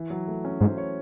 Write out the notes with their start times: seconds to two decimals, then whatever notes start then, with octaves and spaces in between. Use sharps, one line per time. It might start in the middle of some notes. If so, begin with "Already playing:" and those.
Already playing: E3
0.10 F#3
0.28 A3
0.45 C#4
0.60 G#2 C5
0.78 C#5